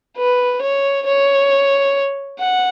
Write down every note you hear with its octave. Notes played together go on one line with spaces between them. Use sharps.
B4
C#5
C#5
F#5